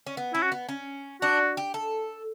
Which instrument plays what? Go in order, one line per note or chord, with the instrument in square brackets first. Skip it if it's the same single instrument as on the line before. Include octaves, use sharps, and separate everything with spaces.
[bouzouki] C#4
B3
[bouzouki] C#4 [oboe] E4
[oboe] F#4
[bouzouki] B3
C#4
[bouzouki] D4 [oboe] F#4
[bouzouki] G4
A4